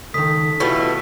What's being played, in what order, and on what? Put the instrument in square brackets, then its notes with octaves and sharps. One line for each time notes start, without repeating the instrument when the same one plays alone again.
[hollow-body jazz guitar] C#2 D#3 [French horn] A4 [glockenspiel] D#6 B6
[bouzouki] B2 A3 [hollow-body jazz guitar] E4 F4 G4